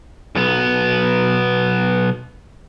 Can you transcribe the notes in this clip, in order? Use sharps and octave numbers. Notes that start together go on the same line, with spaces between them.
B1 B3